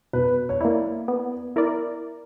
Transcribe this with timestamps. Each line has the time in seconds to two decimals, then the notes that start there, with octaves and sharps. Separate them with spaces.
0.13 B2 B4
0.49 C#5
0.61 A#3 E4 D5
1.08 B3
1.56 E4 A#4 D5